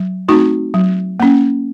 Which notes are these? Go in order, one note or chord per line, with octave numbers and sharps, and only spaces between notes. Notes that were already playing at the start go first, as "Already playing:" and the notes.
Already playing: F#3
A3 C4 D#4 F#4
F#3
A#3 C#4